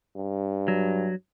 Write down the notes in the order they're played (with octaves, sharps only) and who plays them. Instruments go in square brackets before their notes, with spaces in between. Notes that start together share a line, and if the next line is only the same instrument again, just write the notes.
[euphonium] G2
[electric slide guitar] F#3